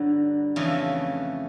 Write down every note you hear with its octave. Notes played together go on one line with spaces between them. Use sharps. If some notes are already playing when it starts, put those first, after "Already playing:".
Already playing: G2 D3 F#3
F2 C#3 E3 A3